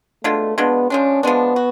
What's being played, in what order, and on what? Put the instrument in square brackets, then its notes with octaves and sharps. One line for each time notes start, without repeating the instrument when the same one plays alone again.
[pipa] B2 G#3 D4 F4 [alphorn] A3
[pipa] B2 G#3 D4 F4 [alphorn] B3
[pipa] F3 G#3 D4 [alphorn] C#4
[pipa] F3 G#3 D4 [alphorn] B3
[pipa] F#4